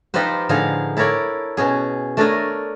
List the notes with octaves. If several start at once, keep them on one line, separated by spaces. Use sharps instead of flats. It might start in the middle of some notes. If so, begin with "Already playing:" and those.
F3 D#4 F4 G4 B4 C5
A2 D3 F3 D#4 G#4 F5
E4 A4 A#4 C#5 D5
B2 C#4 G#4
A3 D4 A4 A#4 C#5 D#5